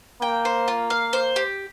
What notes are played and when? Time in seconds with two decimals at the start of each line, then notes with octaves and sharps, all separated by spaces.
0.22 A#3 G5
0.45 C5
0.68 F4
0.90 F5
1.13 C5
1.36 G4